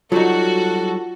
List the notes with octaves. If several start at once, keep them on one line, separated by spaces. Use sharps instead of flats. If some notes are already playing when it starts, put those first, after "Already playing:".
F#3 G3 D#4 F4 F#4 A4